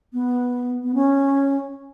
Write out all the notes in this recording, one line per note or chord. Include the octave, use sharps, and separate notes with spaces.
B3
B3
C#4